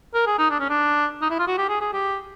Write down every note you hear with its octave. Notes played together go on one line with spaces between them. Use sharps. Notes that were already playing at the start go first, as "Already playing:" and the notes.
A#4
G#4
D#4
D4
C#4
D4
D#4
E4
F4
F#4
G4
G#4
G#4
G4